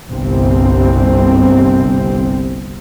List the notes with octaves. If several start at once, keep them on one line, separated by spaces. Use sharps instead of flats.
G1 C2 C4